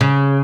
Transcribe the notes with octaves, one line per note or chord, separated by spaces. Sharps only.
C#3